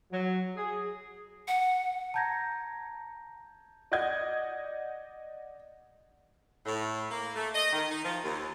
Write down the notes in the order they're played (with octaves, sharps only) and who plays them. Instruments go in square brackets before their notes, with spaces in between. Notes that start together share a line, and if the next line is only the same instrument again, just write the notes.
[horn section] F#3
G#4
[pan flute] F#5
[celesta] A5 A#5 G6 G#6 A#6
[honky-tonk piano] D5 D#5 F#5 D#6 G6 G#6
[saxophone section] A2
A#3
A3
D#5
D#3
D#4
F3
D#2